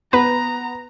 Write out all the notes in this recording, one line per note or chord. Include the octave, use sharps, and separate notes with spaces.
B3 B4 A#5